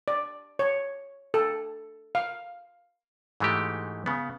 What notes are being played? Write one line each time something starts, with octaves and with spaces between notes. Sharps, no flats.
D5
C#5
A4
F5
G#2 E3 G#3 A3 F#4 G4
C#3 B3